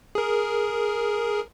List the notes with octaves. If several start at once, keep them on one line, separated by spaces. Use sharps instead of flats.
G#4 A#4